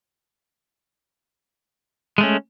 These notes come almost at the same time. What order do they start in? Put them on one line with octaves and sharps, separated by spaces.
G#3 A3 C#4